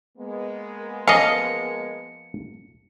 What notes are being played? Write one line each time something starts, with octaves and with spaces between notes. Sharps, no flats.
G#3 A#3 B3
F3 C#4 D#5 F5 C#7